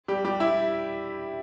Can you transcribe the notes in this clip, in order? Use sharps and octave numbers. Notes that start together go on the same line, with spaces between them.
G3 G4
G3 G4
E4 E5